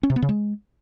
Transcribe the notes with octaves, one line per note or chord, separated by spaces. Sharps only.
C#4
C3
B3
C#3
G#3